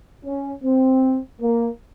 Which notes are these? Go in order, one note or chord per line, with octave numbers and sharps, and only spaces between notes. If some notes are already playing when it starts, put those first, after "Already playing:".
C#4
C4
A#3